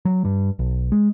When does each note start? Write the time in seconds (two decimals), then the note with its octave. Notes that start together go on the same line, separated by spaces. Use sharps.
0.05 F#3
0.25 G2
0.59 B1
0.92 G#3